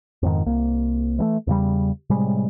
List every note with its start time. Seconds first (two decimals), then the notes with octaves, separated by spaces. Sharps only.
0.23 F2 G#2 D#3
0.46 C2 A#3
1.19 E3 G3 A3
1.47 E2 C#3 G3
2.10 A2 C3 G3 G#3